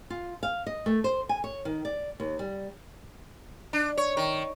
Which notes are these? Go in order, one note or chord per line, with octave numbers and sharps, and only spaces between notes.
F4
F5
D#5
A3
C5
G#5
C#5
D#3
D5
D#2
G3
D4
C#5
D#3